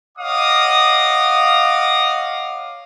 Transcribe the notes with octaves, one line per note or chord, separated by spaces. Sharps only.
C#5 D#5 F5 F#5 D6 D#6